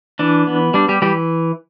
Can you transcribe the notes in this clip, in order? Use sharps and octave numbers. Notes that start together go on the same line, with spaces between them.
E3 D4
B3
G3 D4
G3 G4
E3 G3 G4